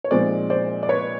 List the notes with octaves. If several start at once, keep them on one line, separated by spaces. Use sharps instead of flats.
C#5
A#2 F3 G#3 C4 D#4 C5 D5
C5 D5
D5
B4 C#5